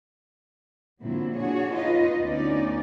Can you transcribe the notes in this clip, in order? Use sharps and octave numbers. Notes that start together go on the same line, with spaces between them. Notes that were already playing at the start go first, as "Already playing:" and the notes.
A#2 D3 F#3 C4 E4
D4 F#4 G#4 C#5
D#4 F4 B4 D#5
D2 B3 C#4 D#4 D5